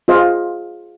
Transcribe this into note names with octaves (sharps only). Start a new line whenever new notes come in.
F4 G#4 C5 D#5 F5